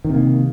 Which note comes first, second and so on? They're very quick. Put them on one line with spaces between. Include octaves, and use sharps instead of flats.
D#3 C3 A#3